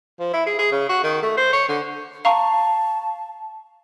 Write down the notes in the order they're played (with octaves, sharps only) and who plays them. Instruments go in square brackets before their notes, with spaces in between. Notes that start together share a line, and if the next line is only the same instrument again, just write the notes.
[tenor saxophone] F3
E4
G#4
G#4
C#3
F#4
D#3
A3
C5
C#5
D3
[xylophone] F5 A#5 C#6 [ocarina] A5